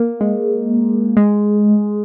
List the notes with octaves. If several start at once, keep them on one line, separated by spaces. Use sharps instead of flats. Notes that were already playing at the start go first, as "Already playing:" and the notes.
Already playing: A#3
G#3
G#3